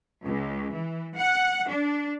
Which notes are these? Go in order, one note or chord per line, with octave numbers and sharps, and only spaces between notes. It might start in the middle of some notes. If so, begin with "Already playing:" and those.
C#2
E3
F#5
D4